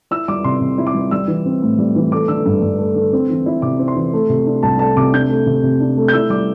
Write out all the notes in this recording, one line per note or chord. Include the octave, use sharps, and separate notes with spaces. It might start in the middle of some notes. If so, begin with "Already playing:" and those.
E4 E6
G3 D6
C3 C6
C3
E4
D6
G3
G3 E6
E3
C4
A2
G3
E3
A3 D6
D3 E6
G2
G2
A3
D3
C4
E3
E4
C3 D6
C4
C6
E3
A3
C3
D4
C2 A5
A3 A5
C3 D6
D4 G6
A3
C3
C3
D4
A3
G6
E4 E6
G3 D6